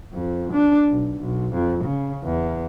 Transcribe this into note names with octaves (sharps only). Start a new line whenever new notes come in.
F2
D4
B1
B1
F2
C#3
E2